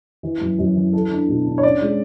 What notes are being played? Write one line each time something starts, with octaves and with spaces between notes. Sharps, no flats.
E3
F#2
F#2
E3
A4
D4
B2
D4
C#5
C#4 D5
G#3